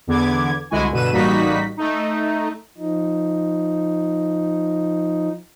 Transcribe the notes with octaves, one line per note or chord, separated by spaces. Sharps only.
E2 D3 B3 D6 G#6
C2 D3 G#3 E4 F#4 G#5
G2 B2 D3 B4 D#7 E7
A1 G3 A#3 D#4 F#4 B6
A3 D#4
F3 D#4